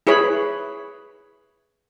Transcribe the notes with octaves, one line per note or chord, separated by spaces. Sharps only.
E4 G#4 B4 C#5 B5